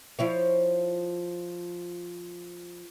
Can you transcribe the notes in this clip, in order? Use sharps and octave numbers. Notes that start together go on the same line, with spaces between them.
F3 E4 C#5